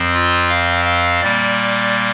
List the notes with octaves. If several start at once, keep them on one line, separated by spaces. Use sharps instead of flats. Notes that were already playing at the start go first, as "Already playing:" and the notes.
Already playing: F2 F3 C4
F4
F5
F5
A#2 G3 A#3 D5